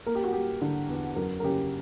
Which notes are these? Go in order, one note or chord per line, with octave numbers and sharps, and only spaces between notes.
A#3 A#4
G4
F#4
A#3 G4
D3
E2
F#2 A#4
A#4
C#3 G4